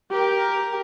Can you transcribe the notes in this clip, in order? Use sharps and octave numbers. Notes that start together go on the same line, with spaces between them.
G4 A#4 G5